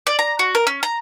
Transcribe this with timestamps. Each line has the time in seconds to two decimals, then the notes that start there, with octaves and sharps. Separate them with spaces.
0.07 D5
0.19 A#5
0.39 F#4
0.55 A#4
0.67 C#4
0.83 A#5